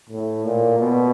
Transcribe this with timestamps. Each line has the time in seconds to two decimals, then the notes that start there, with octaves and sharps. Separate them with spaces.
0.10 A2
0.45 A#2
0.79 B2